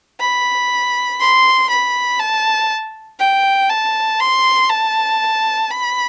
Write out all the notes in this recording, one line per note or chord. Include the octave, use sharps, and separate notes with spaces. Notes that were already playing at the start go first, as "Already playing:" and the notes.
B5
C6
B5
A5
G5
A5
C6
A5
B5